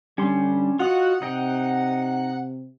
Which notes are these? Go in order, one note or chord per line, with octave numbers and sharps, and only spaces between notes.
D3 G3 C#4 D4 C6
F4 F#4 D#5 F5 F#5
C3 D#4 D#5 G5